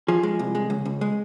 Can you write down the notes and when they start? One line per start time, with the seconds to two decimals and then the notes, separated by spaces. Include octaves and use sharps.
0.08 F3 G#4
0.23 G#3
0.39 C2
0.55 G#3
0.70 C#2
0.85 C#2
1.01 G#3